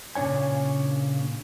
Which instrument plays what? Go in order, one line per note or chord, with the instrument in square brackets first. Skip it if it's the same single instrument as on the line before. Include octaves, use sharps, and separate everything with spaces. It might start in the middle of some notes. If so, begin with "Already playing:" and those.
[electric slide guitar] A#2 C#3 D4 C#5 G#5